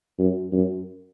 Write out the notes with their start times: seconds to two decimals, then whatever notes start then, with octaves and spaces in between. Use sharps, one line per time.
0.19 F#2
0.52 F#2